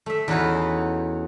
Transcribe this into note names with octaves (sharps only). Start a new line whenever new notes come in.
A3 E5
E2 C#4 D#4 F#4 B4 F5